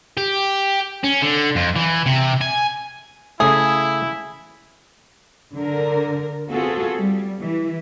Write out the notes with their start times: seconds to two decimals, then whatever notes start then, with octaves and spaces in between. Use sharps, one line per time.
0.17 G4
1.04 C#4
1.22 D3
1.56 F2
1.76 E3
2.06 C3
2.41 G#5
3.40 C#3 A3 E4 G#4
5.53 D3 A#4
6.50 B3 C4 F4 F#4 G#4 A4
7.00 G3
7.40 E3